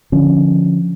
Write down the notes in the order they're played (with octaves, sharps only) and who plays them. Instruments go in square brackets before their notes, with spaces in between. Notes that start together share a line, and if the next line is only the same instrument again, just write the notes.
[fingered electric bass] D3 F3 C#4 D4